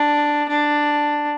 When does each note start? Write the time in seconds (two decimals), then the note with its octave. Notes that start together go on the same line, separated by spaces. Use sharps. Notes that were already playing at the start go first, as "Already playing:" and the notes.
Already playing: D4
0.49 D4